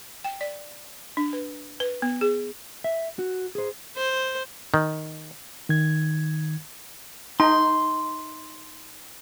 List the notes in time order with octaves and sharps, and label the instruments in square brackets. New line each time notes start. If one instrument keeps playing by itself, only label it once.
[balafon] G5
D5
D4
B4
B4
B3
G#4
[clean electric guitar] E5
F#4
G#4 C5
[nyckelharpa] C5
[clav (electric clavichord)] D#3
[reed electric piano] D#3 G#6
[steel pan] D#4 [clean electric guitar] C6